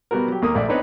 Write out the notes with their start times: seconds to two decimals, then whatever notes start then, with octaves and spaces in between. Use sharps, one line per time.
0.11 B2 G3 B3 F#4 A#4
0.28 F#3 G4
0.42 D#2 A#3 A#4 D#6
0.55 A#1 A3 D5
0.68 B3 C4 D4 D#4 B4 C#5